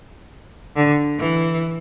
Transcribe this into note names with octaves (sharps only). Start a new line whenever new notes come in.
D3
E3